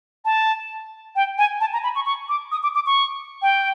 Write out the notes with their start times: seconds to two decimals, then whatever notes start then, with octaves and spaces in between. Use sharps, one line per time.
0.25 A5
1.16 G5
1.38 G#5
1.60 A5
1.73 A#5
1.83 B5
1.95 C#6
2.06 C#6
2.29 D6
2.52 D#6
2.63 D6
2.75 D6
2.86 C#6
3.42 G5